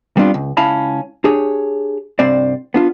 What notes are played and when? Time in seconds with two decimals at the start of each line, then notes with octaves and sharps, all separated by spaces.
0.17 G3 B3 C4 D4 F4
0.34 C#2
0.57 C#2 C#4 E4 F5 A5 B5
1.24 D4 G4 G#4 C#5
2.19 C2 G2 C4 C5 D5
2.74 B3 D4 F4